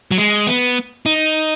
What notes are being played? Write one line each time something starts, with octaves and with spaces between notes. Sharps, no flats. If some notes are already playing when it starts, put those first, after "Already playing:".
F#3
G#3
B3
D#4